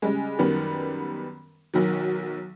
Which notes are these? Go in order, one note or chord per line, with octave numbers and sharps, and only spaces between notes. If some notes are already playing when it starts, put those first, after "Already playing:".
C#3 G3 G#3
F#2 D#3 G3 B3
B1 D#3 F#3